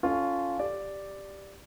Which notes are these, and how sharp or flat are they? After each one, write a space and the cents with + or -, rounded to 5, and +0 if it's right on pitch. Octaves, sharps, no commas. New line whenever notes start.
C#4 +10 F4 +0 A4 +0
G4 +0 D5 +0